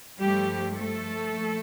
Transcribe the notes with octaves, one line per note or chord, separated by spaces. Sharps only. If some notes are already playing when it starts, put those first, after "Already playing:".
G2 F3 G3 A3 G4
A3 A4
A#2 F3 A#3